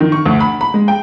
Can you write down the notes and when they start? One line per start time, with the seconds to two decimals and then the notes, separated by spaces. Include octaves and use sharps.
0.01 D#3
0.12 C#6
0.26 D2
0.40 B5
0.61 B5
0.74 G#3
0.88 G5